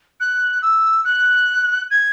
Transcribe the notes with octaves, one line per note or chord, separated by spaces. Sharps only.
F#6
E6
F#6
G#6